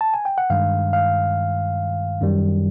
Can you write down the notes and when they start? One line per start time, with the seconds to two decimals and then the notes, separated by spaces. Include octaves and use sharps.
0.01 A5
0.14 G#5
0.25 G5
0.38 F#5
0.50 G2 D#3 G#3 F5
0.93 F5
2.21 F#2 D#3 G3